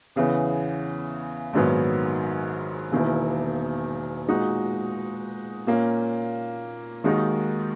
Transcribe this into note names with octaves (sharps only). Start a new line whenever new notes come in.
E2 C#3 E3 B3
A#1 G#2 D#3 F#3 B3
E1 E2 D#3 A#3 E4
A#2 G#3 D#4 F#4
A#2 A#3 C#4
D#2 D#3 G#3 D#4 F#4